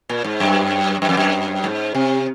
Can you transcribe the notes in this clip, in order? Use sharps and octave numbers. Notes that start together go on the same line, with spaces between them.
A#2
G#2
F#2
F#2
F2
F#2
G#2
C3